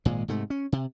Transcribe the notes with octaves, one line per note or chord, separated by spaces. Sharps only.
G#1 A#2 G#3
G#2 C3 A3
C#4
C3